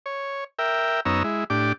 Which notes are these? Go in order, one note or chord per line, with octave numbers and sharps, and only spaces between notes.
C#5
A#4 E5 G5
F#2 B3 D#4 C#5 A#5 E6
G#3 E4
A2 D4 G4 D6